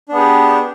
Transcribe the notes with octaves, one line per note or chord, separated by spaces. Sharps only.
B3 D4 G4 G#4